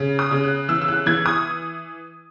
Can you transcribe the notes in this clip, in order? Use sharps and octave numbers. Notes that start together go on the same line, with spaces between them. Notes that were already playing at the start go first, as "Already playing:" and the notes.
Already playing: C#3
D#6
C#3
F#6
E3 E6
E6
F#6
E3 G#6
D#6